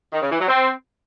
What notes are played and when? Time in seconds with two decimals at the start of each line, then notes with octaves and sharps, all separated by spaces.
0.13 D#3
0.22 C#3
0.31 E3
0.40 F#3
0.49 C4